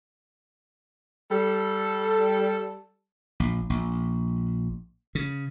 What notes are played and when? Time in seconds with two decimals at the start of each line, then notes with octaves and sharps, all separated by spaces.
1.31 G3 A4
3.40 A#1
3.70 A#1
5.15 C#3